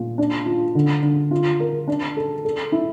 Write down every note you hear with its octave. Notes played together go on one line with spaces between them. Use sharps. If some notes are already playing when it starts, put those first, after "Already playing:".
Already playing: A#2
D4
F4
D3
D3
F4
A#4
D4
A4
A4
E4